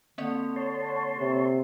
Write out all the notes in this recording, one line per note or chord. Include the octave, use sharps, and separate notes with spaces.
D3 A#3 C4 D5
C#5 A5 C6
C3